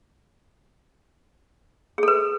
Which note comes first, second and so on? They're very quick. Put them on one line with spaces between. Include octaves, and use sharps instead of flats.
G#4 A4 B4